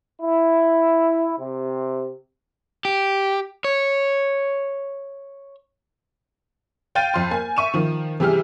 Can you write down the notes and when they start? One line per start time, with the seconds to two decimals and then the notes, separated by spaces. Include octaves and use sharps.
0.21 E4
1.39 C3
2.85 G4
3.64 C#5
6.95 F5 G5 F6 G6 A6 D#7
7.14 F2 C6
7.31 A#3 G#5
7.56 E5 C#6 D#7 E7
7.74 D#3 F3
8.20 C3 E3 G3 G4 G#4 F6